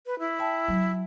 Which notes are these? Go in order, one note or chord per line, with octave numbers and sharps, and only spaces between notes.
B4
E4
E5 G5 A5
F#3